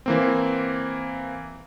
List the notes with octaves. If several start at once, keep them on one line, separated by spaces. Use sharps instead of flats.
E3 A#3 C4